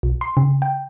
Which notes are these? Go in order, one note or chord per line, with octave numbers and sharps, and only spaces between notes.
B1
C6
C#3
G5